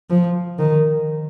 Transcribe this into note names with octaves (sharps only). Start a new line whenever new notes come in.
F3
D#3